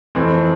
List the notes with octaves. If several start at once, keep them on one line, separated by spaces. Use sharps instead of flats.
F2 E3 A3 C4